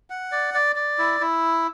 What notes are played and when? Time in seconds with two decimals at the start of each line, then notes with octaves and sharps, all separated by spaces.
0.10 F#5
0.32 D5
0.54 D5
0.76 D5
0.99 E4
1.20 E4